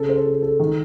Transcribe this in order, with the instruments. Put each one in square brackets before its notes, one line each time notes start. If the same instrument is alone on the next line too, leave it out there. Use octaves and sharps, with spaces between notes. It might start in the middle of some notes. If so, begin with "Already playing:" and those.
Already playing: [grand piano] C#3 A4
C5
A4
A4
D#3